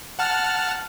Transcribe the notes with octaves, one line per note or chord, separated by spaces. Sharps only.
F#5 A5 F6